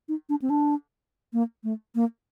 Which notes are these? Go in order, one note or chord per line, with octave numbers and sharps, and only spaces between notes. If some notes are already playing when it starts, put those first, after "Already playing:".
D#4
D4
C4
D4
A#3
A3
A#3